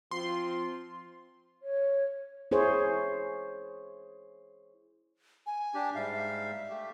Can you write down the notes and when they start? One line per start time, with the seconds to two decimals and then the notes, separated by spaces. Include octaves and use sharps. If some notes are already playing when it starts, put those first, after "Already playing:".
0.11 F3 C4 F4 C6
1.63 C#5
2.51 E4 G#4 C5 C#5
5.46 G#5
5.74 D4 G4
5.95 G#2 G3 E5 F5
6.14 E5
6.69 A3 G4